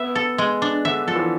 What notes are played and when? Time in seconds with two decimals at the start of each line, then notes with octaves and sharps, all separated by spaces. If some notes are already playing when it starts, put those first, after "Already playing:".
Already playing: B3 E5
0.15 A4
0.38 G#3
0.62 D4
0.85 D3 E5
1.07 F3 A4
1.16 E3